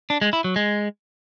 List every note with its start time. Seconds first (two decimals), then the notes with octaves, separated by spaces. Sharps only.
0.10 D4
0.22 G#3
0.33 E4
0.44 F#3
0.56 G#3